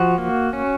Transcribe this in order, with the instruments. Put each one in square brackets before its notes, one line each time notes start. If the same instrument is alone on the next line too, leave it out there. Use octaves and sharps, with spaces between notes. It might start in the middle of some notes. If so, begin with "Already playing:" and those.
Already playing: [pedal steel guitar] F3 F#4
A#3
C#4